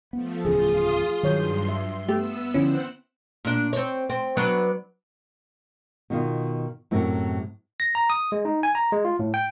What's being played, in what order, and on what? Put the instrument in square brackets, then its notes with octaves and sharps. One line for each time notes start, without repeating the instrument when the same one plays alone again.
[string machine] F3 A3 [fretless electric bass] B3
[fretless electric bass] D1 E2 C#3 [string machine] F4 C6 D#6 [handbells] G#4
[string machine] G2 C6 [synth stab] D#3 C#5 G6 [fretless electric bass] F#3
[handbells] E5
[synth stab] A3 G4 [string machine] B3 E6
[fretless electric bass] D3 F3 [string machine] C4 C5 F#5 [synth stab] C#4 E4
[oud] A#2 D4
C4 C#5
C4
F#3 B3 D4
[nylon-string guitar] B2 D#3 F4
F#2 A2 C3 F#3
[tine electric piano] A#6
A#5
D#6
G#3
D#4
G#5
A#5
G#3
F4
A2
G5